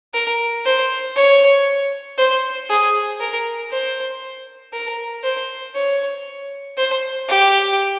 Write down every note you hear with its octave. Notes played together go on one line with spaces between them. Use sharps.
A#4
C5
C#5
C5
G#4
A#4
C5
A#4
C5
C#5
C5
G4